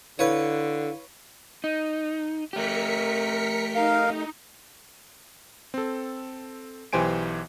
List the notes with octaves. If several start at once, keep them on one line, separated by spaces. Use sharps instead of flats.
D3 E4 B4 C#5 F5
D#4
A3 G4 A#4 B6 C#7
D#4 A#4 F5
C4 A4
B1 E3 G4 C5 G#5 D7